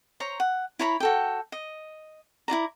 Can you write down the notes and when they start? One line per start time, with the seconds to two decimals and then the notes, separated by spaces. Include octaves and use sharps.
0.20 C5 C#5 A#5
0.40 F#5
0.79 E4 C#5 A#5 B5
1.00 F#4 A4 G5
1.52 D#5
2.48 E4 F4 D5 A#5